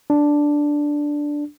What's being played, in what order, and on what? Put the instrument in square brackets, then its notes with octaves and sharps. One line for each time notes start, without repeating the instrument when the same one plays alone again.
[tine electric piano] D4